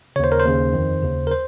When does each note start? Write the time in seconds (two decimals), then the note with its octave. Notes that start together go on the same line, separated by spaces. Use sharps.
0.16 C#3 C#5
0.19 D#2 C5
0.32 A#4
0.40 C5
0.45 D#2 C#3
0.73 F2 D#3
1.03 D#2 C#3
1.27 A#4
1.31 C5